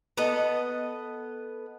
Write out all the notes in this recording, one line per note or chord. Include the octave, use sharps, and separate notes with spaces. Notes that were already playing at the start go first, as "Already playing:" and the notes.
B3 A4 D#5